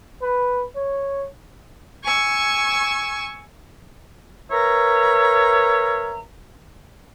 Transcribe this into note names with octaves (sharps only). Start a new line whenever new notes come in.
B4
C#5
G#5 C#6 E6
A#4 B4 C#5 E5 A#5